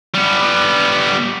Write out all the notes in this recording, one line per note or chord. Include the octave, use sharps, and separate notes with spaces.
G3 B3